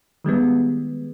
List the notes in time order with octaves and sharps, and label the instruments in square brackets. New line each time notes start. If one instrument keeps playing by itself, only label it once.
[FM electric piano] D#3 G3 G#3 B3